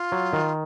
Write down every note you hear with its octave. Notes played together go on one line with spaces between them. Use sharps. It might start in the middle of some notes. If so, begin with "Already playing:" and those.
Already playing: F4
F#3
D#3